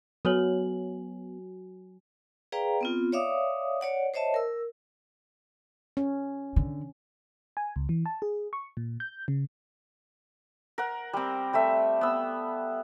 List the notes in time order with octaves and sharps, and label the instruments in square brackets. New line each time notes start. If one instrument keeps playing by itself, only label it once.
[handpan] F#3 [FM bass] B3 [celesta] F#4 G#5 F#7 [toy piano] A4 B4 C#5
[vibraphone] G#4 B4 D5 F5 G5 A#5
B3 C4 F4
C#5 D5 E5 F5 D6 D#6
C#5 D5 F#5
C5 C#5 D#5 E5 A5
A#4 E6
[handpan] C#4
[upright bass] D3
[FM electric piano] G#5
C#2
E3
A5
G#4
C#6
A#2
G6
C#3
[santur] A#4 F#5
G3 C4
G3 A3 E5
B3 E6